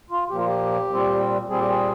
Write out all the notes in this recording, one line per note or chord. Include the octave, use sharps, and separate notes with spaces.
F4
A#2 F3 A#3 G4
F4
G4
A#2 G3 C4
A#2 G3 C4 G#4
G4
G#4